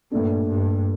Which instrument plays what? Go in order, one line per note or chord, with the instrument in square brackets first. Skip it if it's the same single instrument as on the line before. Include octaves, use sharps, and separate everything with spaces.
[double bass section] G2 [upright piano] A#2 A3 D4
[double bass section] G2